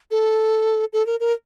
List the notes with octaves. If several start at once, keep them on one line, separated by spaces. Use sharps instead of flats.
A4
A4
A#4
A#4